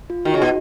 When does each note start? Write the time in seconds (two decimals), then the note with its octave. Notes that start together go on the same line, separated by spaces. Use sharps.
0.10 F4
0.25 D#3 F#4
0.34 C#3
0.42 B2